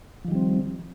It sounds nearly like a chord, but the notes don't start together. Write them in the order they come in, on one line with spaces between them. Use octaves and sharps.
F3 D#3 G3 C4